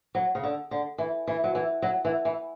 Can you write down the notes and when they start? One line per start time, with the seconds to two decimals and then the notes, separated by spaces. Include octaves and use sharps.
0.15 F#3
0.35 C#3
0.43 D3
0.71 D3
0.98 E3
1.27 E3
1.44 F#3
1.55 E3
1.82 F#3
2.05 E3
2.25 E3